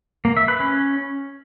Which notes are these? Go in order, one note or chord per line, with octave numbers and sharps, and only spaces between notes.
A#3
E5
B4
C#4